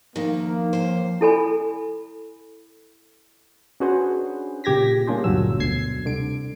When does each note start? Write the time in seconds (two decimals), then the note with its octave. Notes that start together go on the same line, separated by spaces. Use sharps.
0.16 D2 D#3 F3 A#3
0.73 D#2 C5
1.21 E4 A4 G#5 B5
3.80 C#4 D4 F#4 G#4 B4 C5
4.64 A#2 C#3 G4 G#6 A#6 B6
5.07 G3 A#3 C#4 D4 G#4 C5
5.24 G1 D2 A#2 F#3 E6
5.60 D2 B2 G#6 C7
6.05 C2 D3 D7